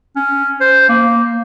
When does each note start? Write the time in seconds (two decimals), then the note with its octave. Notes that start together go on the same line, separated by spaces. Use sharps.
0.16 C#4
0.61 C5
0.89 A#3